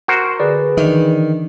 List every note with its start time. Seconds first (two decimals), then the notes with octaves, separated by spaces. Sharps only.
0.08 F#4 A#4 C5
0.40 D3 G#4 B4 D5
0.77 D#3 E3 D4